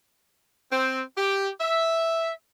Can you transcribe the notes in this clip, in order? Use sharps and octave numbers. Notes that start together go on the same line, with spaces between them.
C4
G4
E5